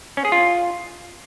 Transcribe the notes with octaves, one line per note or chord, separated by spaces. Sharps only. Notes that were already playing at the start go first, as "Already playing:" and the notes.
C#4
G#4
F4